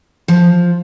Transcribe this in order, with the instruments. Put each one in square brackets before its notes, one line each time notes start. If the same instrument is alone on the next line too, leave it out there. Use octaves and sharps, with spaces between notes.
[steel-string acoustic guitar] F3